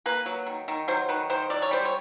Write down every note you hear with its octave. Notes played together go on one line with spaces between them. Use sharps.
A#3 B4
F#3
D#3
D#3
F#3 C5
D#3 B4
D#3 C5
F#3 D5
C#5
G3 C5
C#5